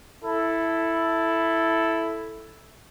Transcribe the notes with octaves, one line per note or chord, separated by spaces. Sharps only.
E4 A4